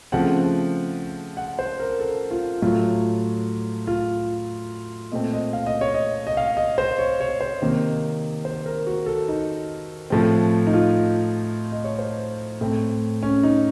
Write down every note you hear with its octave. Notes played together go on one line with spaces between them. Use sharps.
C#3 F3 A3 C4 F#5
F#5
C5
A#4
A4
F4
A2 F#3 A3 F4
F4
A#2 A3 C4 D#5
D#5
F5
D#5
C#5
D#5
D#5
F5
D#5
C5
C#5
C#5
C5
C3 D#3 A#3
C5
A#4
F#4
A4
D#4
A2 F3 A3 C4
D#4
F4
D#5
C#5
C5
A2 A3 C4
C#4
D#4